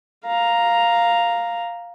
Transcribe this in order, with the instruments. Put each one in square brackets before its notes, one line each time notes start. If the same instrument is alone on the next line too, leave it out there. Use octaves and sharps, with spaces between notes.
[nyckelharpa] F5 A#5